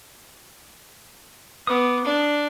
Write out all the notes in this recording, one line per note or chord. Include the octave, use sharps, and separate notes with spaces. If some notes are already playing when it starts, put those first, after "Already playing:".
B3 D6 D#6
D4